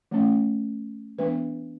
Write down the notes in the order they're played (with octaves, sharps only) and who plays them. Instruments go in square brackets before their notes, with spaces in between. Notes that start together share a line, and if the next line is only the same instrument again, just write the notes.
[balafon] F3 A3 C#4
E3 G#3 B3 D4 B4